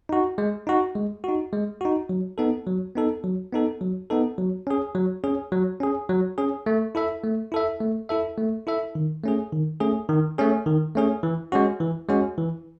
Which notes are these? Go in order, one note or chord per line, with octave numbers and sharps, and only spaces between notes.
D#4 F#4
G#3
D#4 F#4
G#3
D#4 F#4
G#3
D#4 F#4
F#3
B3 D#4 A4
F#3
B3 D#4 A4
F#3
B3 D#4 A4
F#3
B3 D#4 A4
F#3
C#4 G#4
F#3
C#4 G#4
F#3
C#4 G#4
F#3
C#4 G#4
A3
E4 A4 E5
A3
E4 A4 E5
A3
E4 A4 E5
A3
E4 A4 E5
D#3
A3 C#4 G#4
D#3
A3 C#4 G#4
D#3
A3 C#4 G#4
D#3
A3 C#4 G#4
E3
G#3 C#4 F#4
E3
G#3 C#4 F#4
E3